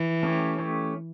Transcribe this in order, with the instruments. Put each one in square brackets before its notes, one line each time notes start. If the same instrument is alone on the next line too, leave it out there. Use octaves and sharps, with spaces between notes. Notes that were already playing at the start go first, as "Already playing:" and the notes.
Already playing: [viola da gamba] E3
[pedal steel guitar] A3 C#4 G4 C#5
A3 C#4 G4 C#5